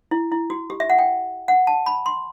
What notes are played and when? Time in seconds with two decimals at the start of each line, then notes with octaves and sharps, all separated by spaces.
0.11 E4
0.32 E4
0.50 F#4
0.70 G4
0.80 E5
0.90 F#5
0.99 G5
1.48 F#5
1.67 A5
1.86 B5
2.06 C6